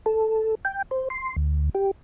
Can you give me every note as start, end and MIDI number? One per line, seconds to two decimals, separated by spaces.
0.06 0.55 69
0.65 0.82 79
0.91 1.08 72
1.10 1.36 84
1.36 1.69 38
1.75 1.91 67